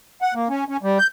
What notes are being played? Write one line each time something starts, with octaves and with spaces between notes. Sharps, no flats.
F#5
A#3
C#4
C#4
G3
G6